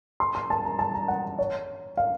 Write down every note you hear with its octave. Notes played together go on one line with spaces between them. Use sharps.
C6
C6
A5
A#5
A5
A#5
F#5
C#5
F5